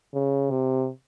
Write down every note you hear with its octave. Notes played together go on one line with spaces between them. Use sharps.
C#3
C3